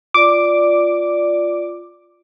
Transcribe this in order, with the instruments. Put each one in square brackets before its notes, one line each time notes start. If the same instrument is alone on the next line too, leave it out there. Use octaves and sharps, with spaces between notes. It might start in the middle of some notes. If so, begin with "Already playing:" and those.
[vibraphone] F4 D5 [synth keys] D6